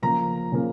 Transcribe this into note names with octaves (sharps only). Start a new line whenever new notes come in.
C#3 F3 A#3 A#5
C#3 F3 A#3